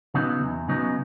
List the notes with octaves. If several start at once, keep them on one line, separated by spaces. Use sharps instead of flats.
C#3 F#3 B3 D#4
E2
C#3 F#3 B3 D#4